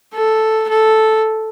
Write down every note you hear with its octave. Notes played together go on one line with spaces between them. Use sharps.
A4
A4